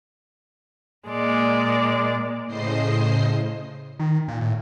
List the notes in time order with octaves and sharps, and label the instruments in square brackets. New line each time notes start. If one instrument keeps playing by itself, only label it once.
[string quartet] A#2 G#3 D5
[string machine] A2 C#3 C5 D#5 C7
[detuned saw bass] D#3
A#2
A2